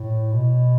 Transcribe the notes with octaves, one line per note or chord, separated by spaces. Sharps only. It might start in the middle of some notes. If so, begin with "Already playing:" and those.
Already playing: A2
B2